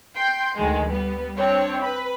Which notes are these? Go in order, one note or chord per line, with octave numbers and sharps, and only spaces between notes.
G5 C6 G6
D2 D#3 G#3
G3 B3
C4 D4 C#5
B4 B5